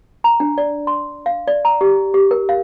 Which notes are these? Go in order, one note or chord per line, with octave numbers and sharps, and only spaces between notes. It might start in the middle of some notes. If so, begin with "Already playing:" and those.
A#5
D4
D5
C6
F5
D5
A#5
G4
G4
A#4
F5